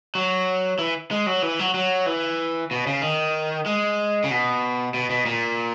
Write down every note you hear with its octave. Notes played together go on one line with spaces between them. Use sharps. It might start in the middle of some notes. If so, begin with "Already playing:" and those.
F#3
E3
G#3
F#3
E3
F#3
F#3
E3
B2
C#3
D#3
G#3
C#3
B2
B2
B2
A#2